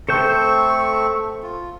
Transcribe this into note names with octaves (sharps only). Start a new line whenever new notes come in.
A3 C4 A4 C5 C#6 G6
F4